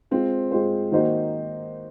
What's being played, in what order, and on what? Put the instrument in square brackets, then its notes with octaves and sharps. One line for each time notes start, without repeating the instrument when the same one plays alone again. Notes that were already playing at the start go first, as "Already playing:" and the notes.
[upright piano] G#3 C4 F4 C5
G#3 C4 F4 C5
D#3 A#3 D#4 F#4 C5